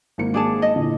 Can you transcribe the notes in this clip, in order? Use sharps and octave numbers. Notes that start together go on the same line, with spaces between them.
G#1 A#3 C#7
D4 G#4 A5
D#5
E2 A#2 D3